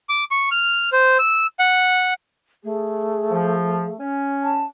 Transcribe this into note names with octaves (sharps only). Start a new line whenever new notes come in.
D6
C#6
F6
C5
E6
F#5
A3 G#4
F3
C#4
A5